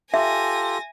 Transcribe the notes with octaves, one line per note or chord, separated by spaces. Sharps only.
F4 G4 A4 E5 G#5 A#6